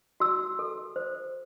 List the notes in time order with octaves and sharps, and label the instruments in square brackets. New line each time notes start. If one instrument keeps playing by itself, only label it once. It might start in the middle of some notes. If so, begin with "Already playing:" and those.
[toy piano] F#4 E6
A4
C5